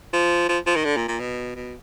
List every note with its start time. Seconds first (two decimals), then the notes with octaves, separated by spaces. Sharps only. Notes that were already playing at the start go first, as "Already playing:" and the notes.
0.13 F3
0.49 F3
0.67 F3
0.76 D#3
0.85 D3
0.97 A#2
1.08 A#2
1.20 B2
1.56 B2